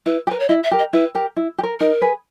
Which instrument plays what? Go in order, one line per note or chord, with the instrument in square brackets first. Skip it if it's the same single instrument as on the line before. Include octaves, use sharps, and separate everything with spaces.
[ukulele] E4 [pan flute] B4
[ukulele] G4
[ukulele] A#4 [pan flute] B4
[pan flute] C#5
[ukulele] E4 [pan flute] D#5
[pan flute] E5
[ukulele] G4 A#4
[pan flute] D#5
[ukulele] E4 [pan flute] B4
[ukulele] G4 A#4
E4
G4
A#4
[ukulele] D#4 [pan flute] A#4
[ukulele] G#4 B4